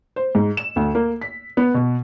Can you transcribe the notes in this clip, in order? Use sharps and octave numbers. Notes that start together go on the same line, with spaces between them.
C5
G#2
E7
D2
A#3
B6
B3
B2